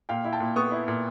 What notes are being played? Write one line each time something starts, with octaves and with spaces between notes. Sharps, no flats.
A#2 F5 G5
E4
G5 A5
A#2
B3 C#6 D#6
E4
A#2